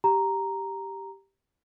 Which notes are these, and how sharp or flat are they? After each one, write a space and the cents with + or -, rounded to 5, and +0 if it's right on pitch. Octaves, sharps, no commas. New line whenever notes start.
G4 +0 A#5 +0